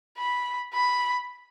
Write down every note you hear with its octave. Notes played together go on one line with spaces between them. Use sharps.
B5
B5